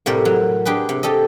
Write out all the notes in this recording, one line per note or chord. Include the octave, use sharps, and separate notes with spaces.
A2 C3 G3 A#4
F#3
D4 G4 G#4 B4
C3
G4 A4 D#5